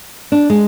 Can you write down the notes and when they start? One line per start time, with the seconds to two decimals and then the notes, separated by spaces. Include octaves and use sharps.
0.32 D4
0.50 G#3